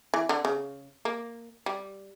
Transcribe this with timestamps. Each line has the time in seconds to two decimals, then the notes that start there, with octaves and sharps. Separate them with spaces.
0.14 E3
0.29 D3
0.45 C#3
1.05 A#3
1.66 G3